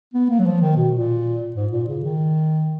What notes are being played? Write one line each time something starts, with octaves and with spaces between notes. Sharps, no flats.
B3
A#3
F#3
F3
D#3
B2
A#2
G#2
A#2
C#3
D#3